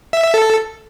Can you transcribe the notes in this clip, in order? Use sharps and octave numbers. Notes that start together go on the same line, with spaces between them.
E5
E5
A4